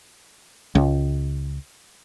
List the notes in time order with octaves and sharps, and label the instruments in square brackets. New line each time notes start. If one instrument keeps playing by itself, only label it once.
[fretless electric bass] C#2